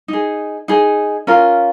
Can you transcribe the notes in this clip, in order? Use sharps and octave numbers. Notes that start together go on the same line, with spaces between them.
D#4 G#4
D#4 G#4
C#4 F4 A#4